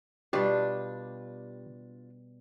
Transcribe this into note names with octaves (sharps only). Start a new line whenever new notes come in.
B2 G3 D4 F4 G4